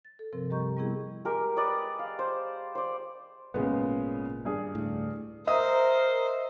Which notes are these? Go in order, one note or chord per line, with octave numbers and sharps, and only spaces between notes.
A6
A4
G2 C3 F3 C4 A#4
G3 G4 D#5 A#5 C#6 G6
G3 B3 C4 E4 G#4
G#3 G4 A#4
B4 D5 D#5
F5
C5
C5 D5
G#1 A#2 C#3 G#3 B3
G2 G#4
D2 A2
A#4 C5 D#5 E5 D#6